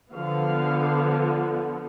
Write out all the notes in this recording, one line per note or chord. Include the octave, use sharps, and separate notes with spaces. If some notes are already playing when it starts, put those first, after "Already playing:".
D3 F3 B3 F5